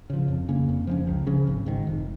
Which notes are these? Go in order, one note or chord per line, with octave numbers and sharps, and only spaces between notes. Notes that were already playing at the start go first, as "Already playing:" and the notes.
C#3 F3
F2
C#3 A#3 C#4
F2
F3 A#3 C#4
C#2
C#3 F3 C#4
G#1
G#2 D#3
F1